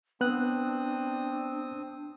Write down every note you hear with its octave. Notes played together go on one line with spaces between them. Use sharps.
B3 C4 D4 D#6 F#6